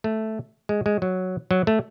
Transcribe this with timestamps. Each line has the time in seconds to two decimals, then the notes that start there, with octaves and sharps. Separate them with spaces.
0.04 A3
0.69 G#3
0.86 G#3
1.02 F#3
1.51 F#3
1.67 A3